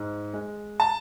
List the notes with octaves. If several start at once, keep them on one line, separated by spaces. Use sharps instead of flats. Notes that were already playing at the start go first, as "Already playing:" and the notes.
Already playing: G#2
G#3
A5